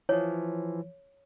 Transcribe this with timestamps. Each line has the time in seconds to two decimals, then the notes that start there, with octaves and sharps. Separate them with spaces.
0.09 E3 F3 C#5